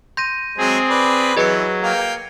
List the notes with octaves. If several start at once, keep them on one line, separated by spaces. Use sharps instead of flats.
C6 G6 A#6 D#7
F#3 G#3 C4 G#4
B4 D5
E3 F#3 G#4 B4 D#5 G#6 C#7
A#3 F5 G5